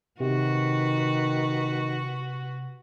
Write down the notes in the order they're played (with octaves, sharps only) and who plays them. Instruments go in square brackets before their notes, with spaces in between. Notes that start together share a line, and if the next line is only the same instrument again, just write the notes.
[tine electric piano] C3 [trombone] D#3 [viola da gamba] F#4 B4